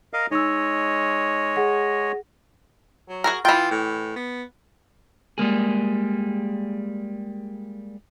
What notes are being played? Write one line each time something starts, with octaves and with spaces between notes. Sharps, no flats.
A#4 D#5 F5
G#3 D#4 C#5 D#5 E6
G#4 F#5 A#6
F#3
F#4 G#4 A#4
E3 F4 G5
A2
B3
G3 G#3 A#3 G#4